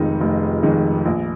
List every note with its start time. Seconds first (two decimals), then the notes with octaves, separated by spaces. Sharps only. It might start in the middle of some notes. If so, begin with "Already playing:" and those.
Already playing: F1 F2 D#3 G#3 D#4
0.21 F1
0.63 F2 D#3 G#3 D#4
1.05 A#1